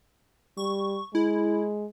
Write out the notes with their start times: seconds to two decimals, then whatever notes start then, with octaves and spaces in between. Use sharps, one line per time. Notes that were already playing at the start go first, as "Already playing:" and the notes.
0.57 G3 C#6
1.15 G#3 E4